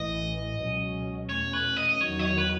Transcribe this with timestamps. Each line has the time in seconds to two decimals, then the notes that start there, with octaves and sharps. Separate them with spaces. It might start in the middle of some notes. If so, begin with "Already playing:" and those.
Already playing: A1 A2 E3 D#5
0.58 C#2 B2 F#3 C#4
1.29 E2 B2 A3 C#4 C#5
1.53 B4
1.77 D#5
1.89 D#5
2.01 E2 D#3 F#3 C#5
2.19 D#5
2.24 C#5
2.38 B4